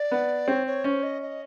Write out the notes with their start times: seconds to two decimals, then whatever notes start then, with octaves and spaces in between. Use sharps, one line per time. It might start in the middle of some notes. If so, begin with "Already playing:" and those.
Already playing: D5
0.11 B3
0.48 C4 C#5
0.67 C#5
0.84 C#4 C5
1.03 D#5
1.22 D#5